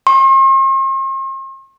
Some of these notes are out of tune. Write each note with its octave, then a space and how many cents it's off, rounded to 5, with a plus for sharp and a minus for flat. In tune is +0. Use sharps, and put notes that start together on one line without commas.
C6 +45